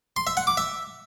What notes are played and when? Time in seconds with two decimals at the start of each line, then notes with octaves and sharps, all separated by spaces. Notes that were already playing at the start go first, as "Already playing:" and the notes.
0.16 C6
0.27 E5
0.37 F#5
0.47 D6
0.57 E5